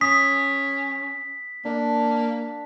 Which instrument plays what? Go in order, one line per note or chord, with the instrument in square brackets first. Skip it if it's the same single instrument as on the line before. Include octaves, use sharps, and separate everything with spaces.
[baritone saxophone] C#4 [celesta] D#6 [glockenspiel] B6
[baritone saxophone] A#3 [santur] D4